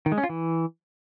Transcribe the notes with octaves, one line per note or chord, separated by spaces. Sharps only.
D#3
G#3
C#4
F4
E3